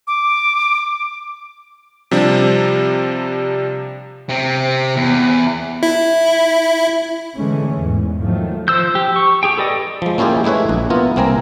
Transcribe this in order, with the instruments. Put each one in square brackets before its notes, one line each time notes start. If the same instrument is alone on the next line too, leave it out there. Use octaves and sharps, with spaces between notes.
[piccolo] D6
[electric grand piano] C3 F3 G3 D4
[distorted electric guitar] C3 C4
E2
[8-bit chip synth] E4
[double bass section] D3 E3 G#3 A3 C#4
E2 G#2
D#3 F3 F#3 A3
[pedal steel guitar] F3 C5 E6 G6
G4
C#6
G4 G#4 G5
A4 B4 D5 D#5
[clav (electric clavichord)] F3 G#3
A#3 C#4 E4 F4 G4 G#4
G#3 A3 E4 B4 C#5
A#1
B3 E4 F4 A#4
C2 A#3 C4 G#5 A#5